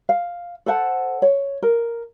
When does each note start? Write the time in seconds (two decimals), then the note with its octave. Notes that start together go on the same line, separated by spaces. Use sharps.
0.09 F5
0.66 A4 C5 F#5 A5
1.22 C#5
1.62 A#4